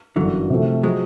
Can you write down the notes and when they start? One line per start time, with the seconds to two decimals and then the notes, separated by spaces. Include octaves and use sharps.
0.16 G1 F#2 D3 E3 F#3
0.50 C3 F3 A3
0.83 F3 F#3 G#3